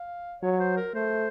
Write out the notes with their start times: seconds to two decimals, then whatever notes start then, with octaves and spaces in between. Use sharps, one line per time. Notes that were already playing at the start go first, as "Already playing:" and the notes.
Already playing: F5
0.42 F#3 C#5
0.60 C5
0.77 A#4
0.94 A3 C5